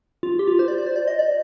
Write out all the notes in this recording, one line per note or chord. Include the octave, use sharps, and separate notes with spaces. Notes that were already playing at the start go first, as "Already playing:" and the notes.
F4
G4
F4
C5
D5
D5
C5
D5
D#5
D5